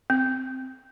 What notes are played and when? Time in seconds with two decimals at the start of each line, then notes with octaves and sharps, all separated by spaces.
0.10 C4